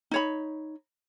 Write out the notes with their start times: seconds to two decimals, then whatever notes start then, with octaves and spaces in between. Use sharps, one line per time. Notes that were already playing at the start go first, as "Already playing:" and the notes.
0.11 D#4 C#5 B5